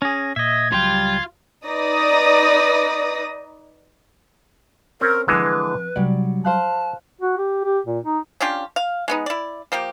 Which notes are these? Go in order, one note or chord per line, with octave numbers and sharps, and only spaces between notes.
C#4 G#4 A#6
A#2 D#5 E5 G#6
C#2 F#3 G3 F4 G5
D#4 B4 D5 D#6 A#6
C4 C#4 A#4
D3 E3 F3 G#3 C4 B4
C3 F#3 G3 D4 D5
F3 C5 F5 A5 F#6
F#4
G4
G4
A#2
D#4
C#4 D4 F4 G4
F5
G#3 B3 D#4
E4 D5
F3 A#3 G4